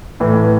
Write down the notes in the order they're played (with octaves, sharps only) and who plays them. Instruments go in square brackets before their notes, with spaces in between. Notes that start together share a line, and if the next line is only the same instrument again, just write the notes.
[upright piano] A2 E3